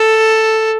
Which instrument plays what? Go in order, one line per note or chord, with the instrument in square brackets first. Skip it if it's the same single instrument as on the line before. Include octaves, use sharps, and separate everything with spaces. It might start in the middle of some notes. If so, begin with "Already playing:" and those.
Already playing: [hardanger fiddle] A4